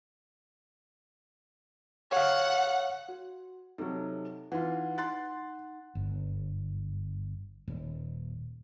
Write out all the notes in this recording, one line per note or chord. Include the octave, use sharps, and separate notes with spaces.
C#5 F5 F#5
F#4
C3 F#3 D#4 G4 A4
E3 D#4 F4 F#5
C6 F#6 A6
G1
D#1